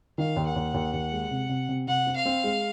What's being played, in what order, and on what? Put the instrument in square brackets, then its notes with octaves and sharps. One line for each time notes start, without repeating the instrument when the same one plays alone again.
[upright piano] D#3 [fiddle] F5
[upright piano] D#2
[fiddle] F#5
[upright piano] D#2
D#2
D#2
G#3
C3
C3
C3
[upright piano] C3 [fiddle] F#5
[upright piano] C4
[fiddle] F5
[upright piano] C4
G#3